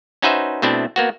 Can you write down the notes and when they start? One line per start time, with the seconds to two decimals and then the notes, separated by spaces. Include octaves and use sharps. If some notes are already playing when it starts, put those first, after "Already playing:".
0.22 C#4 D#4 F#4 B4 C5 E5
0.62 B2 A3 C4 D4 E4
0.96 A#3 B3 F#4